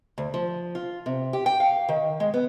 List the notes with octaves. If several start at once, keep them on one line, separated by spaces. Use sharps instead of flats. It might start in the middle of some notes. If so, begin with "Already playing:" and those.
D2
F3
F4
C3
G4
G5
F5
D#3
G#3
B3